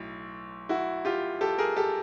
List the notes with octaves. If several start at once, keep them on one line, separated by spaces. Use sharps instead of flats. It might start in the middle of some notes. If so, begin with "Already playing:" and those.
Already playing: B1 A2
E4 F#4
F4 G4
G4 A4
G#4 A#4
G4 A4